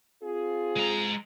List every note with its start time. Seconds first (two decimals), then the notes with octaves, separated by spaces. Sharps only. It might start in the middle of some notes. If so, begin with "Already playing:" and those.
0.23 C4 F4 G#4
0.77 G#3 A#5